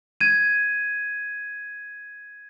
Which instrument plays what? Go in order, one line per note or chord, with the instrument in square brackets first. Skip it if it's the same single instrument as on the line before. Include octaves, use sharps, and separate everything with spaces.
[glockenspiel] G#6 D#7